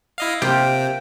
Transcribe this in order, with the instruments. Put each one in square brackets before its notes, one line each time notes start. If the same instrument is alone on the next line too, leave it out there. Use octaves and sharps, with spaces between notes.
[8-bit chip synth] E4 D#5 F5
[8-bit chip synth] C3 [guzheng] A#3 F4 G4 [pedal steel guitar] G5